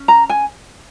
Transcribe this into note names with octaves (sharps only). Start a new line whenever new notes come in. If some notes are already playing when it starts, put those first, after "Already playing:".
Already playing: C#4
A#5
G#5